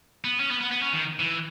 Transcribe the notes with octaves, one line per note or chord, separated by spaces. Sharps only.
B3
C#4
B3
B3
B3
C#4
D#3
E3